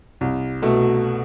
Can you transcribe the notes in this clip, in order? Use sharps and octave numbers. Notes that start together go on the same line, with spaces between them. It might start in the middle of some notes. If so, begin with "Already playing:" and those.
C2
B2 A3